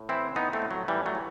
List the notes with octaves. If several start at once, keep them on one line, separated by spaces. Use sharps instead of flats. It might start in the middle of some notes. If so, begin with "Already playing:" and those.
Already playing: A2
E3 C4 E4
E3 B3 D#4
A3 C4
A2
F#3
A2 E3 G3
F#3 A3
E3